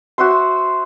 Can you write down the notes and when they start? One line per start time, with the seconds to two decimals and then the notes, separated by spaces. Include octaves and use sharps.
0.18 F#4 C5 E5 C6